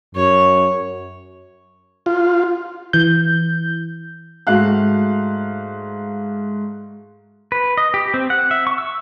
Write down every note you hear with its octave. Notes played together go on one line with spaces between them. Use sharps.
F#2 C#5
F4
E3 G6
G#2 A3 F#4 F5 F#6
B4
D#5
G4
C4
F#5
E5
C#6
E6